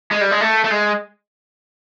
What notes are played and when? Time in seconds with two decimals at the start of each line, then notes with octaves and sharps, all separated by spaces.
0.12 G#3
0.21 G3
0.31 G#3
0.41 A3
0.64 A3
0.70 G#3